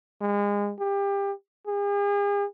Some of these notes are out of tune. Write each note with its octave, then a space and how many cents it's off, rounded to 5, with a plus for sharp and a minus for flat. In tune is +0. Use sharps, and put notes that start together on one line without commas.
G#3 -30
G4 +25
G#4 -45